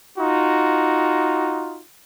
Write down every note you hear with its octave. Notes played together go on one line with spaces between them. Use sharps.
D#4 F4 F#4